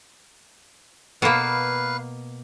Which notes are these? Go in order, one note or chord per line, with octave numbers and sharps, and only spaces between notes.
B2 A#3 B4 F5